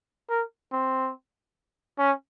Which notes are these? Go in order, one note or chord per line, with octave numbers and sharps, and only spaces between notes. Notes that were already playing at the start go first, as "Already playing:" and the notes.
A#4
C4
C#4